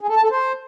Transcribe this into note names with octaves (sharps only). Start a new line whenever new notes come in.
G#4
A4
A5
A4
C5